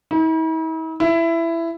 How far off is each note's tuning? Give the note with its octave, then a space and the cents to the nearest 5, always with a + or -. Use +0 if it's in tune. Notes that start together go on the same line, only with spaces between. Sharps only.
E4 -45
E4 +15